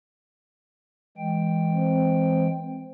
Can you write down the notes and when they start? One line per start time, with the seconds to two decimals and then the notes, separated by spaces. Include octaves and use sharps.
1.18 E3 G#3 G5
1.73 C4